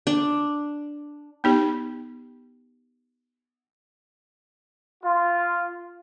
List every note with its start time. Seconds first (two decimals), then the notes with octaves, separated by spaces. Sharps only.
0.07 D4
1.44 B3 D#4 G4
5.03 F4